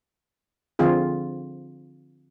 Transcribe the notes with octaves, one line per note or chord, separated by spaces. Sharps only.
D3 F3 C4 F4 G#4